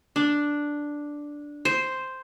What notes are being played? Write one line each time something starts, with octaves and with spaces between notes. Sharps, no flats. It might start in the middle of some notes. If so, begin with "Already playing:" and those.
D4
C5